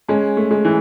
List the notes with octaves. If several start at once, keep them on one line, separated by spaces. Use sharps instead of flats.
G#3 C#4
A3
G#3
E3